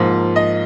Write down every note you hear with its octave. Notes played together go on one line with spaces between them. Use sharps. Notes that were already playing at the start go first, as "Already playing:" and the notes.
Already playing: G#2 F3 A#3
D#5